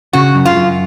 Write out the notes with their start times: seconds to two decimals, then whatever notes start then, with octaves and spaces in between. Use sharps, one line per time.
0.13 C#3 F#4
0.35 F#2
0.46 F4
0.56 F#2